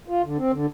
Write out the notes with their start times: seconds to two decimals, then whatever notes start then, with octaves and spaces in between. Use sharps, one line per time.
0.08 F4
0.23 D3
0.38 C4
0.52 D3